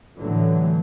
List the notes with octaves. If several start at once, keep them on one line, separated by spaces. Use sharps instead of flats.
A1 A2 D3 E3 F#3